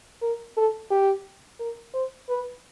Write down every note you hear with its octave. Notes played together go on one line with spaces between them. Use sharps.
A#4
A4
G4
A#4
C5
B4